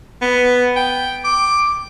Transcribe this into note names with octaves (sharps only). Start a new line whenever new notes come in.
B3
G5
D6